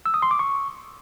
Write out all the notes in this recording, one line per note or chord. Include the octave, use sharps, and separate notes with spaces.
E6
D#6
C6
D6
C#6